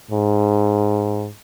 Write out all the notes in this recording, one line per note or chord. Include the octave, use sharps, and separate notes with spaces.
G#2